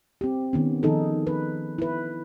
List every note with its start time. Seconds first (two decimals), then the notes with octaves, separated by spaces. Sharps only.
0.21 C4 G4
0.53 D#3 B3 C#4
0.83 D#3 F3 D#4 G#4 A4
1.27 B4
1.78 E4 B4